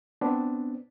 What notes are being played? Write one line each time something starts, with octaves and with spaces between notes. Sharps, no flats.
B3 C4 D4